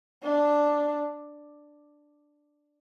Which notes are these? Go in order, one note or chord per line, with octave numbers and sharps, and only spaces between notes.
D4